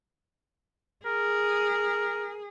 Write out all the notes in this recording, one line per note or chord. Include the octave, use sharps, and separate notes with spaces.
G#4 A#4